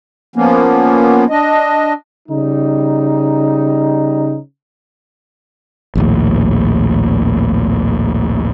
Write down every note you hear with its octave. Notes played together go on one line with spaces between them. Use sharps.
F3 A#3 B3 C#4
D4 D#5
C#3 G3 D#4
A#1 D#2 A2